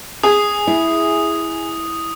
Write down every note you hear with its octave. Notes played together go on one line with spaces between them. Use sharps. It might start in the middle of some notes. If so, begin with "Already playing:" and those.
G#4 D#6
E4